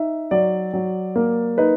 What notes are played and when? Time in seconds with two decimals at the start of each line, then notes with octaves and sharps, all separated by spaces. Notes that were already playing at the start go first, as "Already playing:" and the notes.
Already playing: D#4 E5
0.31 F#3 D5
0.73 F#3
1.16 A#3
1.58 D#4 B4